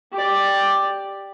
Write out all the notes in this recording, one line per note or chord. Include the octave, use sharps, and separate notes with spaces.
G4 D5